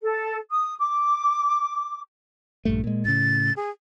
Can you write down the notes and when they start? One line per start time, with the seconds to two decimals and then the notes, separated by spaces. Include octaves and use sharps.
0.02 A4
0.51 D#6
0.80 D6
2.65 A#1 G2 A3
2.84 A#2 G#3
3.05 A2 C#3 A6
3.57 G#4